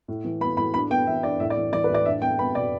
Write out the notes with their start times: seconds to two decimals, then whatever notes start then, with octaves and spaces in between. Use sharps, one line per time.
0.08 A2
0.24 E3
0.41 B3 B5
0.57 A2 B5
0.74 D4 B5
0.90 B3 G5
1.06 E3 E5
1.23 D4 D5
1.40 A2 E5
1.50 D5
1.57 E3
1.72 E3 D5
1.84 B4
1.89 A2
1.94 D5
2.05 D4 E5
2.22 B3 G5
2.38 B3 B5
2.55 B2 D5